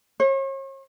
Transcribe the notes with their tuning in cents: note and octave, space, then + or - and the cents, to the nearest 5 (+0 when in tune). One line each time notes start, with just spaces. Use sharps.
C#5 -40